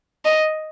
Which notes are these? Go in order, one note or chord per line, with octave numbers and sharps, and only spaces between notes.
D#5